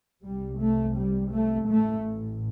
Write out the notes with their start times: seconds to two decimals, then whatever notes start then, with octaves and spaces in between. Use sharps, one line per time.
0.23 C2 C3 G3
0.59 A3
0.97 G3
1.32 A3
1.69 A1 A2 A3